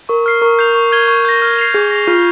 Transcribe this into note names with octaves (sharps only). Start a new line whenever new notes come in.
A#4 C#6
F6 C7
A#4 C#6
G6 C7 F7
C#6
F6 G#6 D#7 G7
C#6
G6 A#6
F6
C7 F7
G#4 G6
A#6 F7
F4 F6